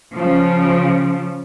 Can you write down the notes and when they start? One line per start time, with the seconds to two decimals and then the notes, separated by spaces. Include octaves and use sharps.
0.12 C#3 F3 C#4